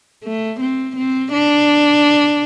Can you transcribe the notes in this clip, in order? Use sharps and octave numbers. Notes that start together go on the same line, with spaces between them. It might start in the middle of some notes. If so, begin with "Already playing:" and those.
A3
C4
C4
D4